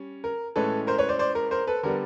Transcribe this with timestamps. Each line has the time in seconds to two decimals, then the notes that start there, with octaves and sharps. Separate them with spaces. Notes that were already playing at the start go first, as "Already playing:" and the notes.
Already playing: G3 C#4
0.24 A#4
0.56 A2 E3 G#3 C#4 A4 B4
0.87 A#4 C5
0.98 B4 C#5
1.09 C5 D5
1.19 C5 D5
1.35 A#4
1.51 A#4 C5
1.67 A4 B4
1.83 D3 G3 B3 A#4